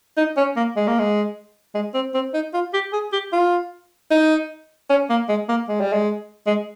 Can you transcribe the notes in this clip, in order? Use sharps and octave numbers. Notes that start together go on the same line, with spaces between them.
D#4
C#4
A#3
G#3
A#3
G#3
G#3
C4
C4
D#4
F4
G4
G#4
G4
F4
D#4
C#4
A#3
G#3
A#3
G#3
G3
G#3
G#3